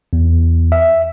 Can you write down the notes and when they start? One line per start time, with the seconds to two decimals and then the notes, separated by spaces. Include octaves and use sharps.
0.13 E2
0.72 E5